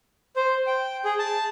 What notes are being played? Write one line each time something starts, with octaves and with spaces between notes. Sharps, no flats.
C5
G5
G#4
A5